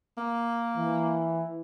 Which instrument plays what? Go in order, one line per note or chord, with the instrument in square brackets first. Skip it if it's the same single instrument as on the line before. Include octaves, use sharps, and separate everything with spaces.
[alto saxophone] A#3
[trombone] E3